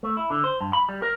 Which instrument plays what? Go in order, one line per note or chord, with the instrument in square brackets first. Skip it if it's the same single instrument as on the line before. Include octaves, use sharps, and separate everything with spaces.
[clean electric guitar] A3
E4
D3
C5
G2
B5
G3
A#4